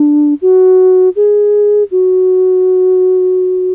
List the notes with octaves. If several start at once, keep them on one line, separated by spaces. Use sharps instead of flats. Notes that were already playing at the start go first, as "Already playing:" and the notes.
Already playing: D4
F#4
G#4
F#4